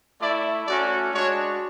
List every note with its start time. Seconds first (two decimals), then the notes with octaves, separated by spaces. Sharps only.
0.21 A3 E4 D5
0.67 A3 C#4 F#4 D5
1.13 G#3 D4 F#4 C#5